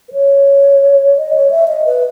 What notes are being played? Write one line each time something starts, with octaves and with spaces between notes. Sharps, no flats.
B4
C#5
D#5
C#5
E5
D#5
B4